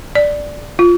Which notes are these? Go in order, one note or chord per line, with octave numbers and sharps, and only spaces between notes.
D5
F4